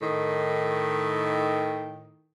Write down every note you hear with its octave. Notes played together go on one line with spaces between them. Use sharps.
A2 D#3